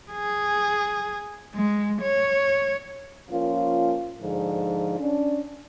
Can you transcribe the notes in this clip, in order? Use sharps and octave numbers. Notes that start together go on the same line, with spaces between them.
G#4
G#3
C#5
F3 A#3 C#4 F4
G#2 D3 F3
C#4 D4